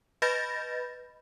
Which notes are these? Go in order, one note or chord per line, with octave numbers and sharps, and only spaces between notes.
B4 D#5 B5 G6 A6 A#6